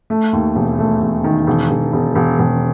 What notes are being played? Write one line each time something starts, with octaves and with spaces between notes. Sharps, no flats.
A3
D#2
E1
A3
E1
D#3
E1
E1
E1
E1
E1